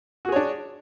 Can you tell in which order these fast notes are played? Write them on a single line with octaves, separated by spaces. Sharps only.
F#4 G#4 C#5 D4